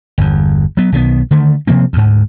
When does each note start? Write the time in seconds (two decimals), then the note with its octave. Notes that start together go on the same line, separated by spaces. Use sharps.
0.18 G1 E2
0.77 F#3 B3
0.92 B1 D#3 E3 B3
1.31 D3 D#3 A3
1.67 C3 F3 A#3 C4
1.93 D2 G#2